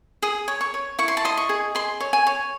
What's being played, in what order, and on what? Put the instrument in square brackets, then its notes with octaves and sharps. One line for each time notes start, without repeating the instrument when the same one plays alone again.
[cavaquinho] G#4 D#6
C#5
C#6
C#5
E4 C#6
C6
A5
D#5 C6
C#6
G#4
G#4 C6
C#5
G#5
C#5